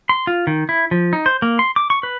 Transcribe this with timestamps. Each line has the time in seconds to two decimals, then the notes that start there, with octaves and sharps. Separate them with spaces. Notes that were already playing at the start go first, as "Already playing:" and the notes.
0.09 C6
0.27 F4
0.47 D#3
0.69 E4
0.91 F3
1.13 D#4
1.26 C5
1.42 A#3
1.59 C6
1.76 D6
1.90 C#6
2.03 B4